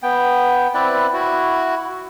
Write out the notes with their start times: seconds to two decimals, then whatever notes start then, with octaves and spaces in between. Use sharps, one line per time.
0.03 B3 G5
0.74 C4 E4 B4 D5
1.13 E4 F#4